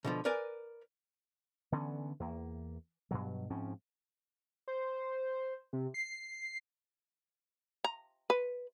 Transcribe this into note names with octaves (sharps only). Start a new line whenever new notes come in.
B2 D3 F3
A#4 B4 D5 G#5
D3 E3 B3 C#4
E2 A#3
G2 B2 F#3
G#2 F3 C4 C#4
C5
C3
C7
A#5
B4